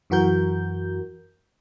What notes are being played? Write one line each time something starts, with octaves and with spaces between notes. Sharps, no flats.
F#2 E3 F#4 A#4 G6